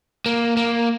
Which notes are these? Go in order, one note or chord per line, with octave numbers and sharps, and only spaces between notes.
A#3
A#3